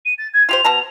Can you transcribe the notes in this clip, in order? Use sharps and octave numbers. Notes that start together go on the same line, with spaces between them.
D#7
A6
G#6
F4 G4 C5 F7
B2 A5 A#5